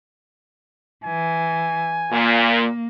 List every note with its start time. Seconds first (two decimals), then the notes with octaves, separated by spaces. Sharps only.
1.04 E3 G#5
2.11 A#2 A#3